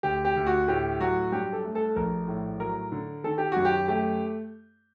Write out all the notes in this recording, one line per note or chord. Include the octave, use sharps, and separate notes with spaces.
D2 G4
G4
D2
F#4
A2 G4
F#3 F#4
G2 G4
A4
A3
A4
A#1 A#4
A2
F#3 A#4
D3
D#3 A4
G4
F#2 F#4
G4
A3 G4